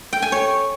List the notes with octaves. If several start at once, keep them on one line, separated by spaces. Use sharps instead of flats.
G5
G#5
C#5